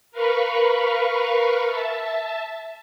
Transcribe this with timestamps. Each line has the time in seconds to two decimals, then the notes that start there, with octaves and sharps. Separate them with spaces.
0.11 A#4 B4 F5 B5 C#6
1.65 E5 A5